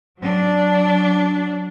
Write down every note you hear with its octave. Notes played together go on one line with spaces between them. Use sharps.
F#3 D4